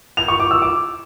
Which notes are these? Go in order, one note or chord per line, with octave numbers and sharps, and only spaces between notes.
F7
C#6
D6
E6
D6